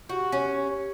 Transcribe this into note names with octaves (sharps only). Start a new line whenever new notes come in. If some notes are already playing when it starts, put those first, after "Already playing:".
F#4 G4
C#4